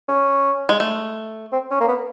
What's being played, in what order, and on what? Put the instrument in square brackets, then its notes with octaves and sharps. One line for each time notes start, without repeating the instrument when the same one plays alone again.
[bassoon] C#4
[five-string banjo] G#3
A3
[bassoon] C4
C#4
A#3
B3